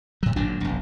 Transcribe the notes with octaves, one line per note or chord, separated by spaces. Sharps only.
A2 F#3
G#1 A#2 F#3 D4
F1 B1